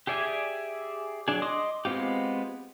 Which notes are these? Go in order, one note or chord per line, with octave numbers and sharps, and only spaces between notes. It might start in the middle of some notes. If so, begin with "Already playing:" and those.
G4 G#4 D5 E5 G#5
F#3 D4 G#4
D#5 C6 D6 D#6
G#3 B3 C4 F4 G4